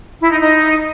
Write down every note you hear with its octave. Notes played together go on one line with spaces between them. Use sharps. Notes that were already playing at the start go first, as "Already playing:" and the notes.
E4
D#4
D#4